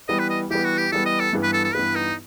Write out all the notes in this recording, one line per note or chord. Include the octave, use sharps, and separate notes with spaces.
E3 G3 B3 D#5
B4
D#5
E3 G3 B3 G4
F#4
G4
E3 G3 B3 A4
D#5
A4
G2 E3 B3
B4
A4
A4
G2 E3 B3 B4
D#4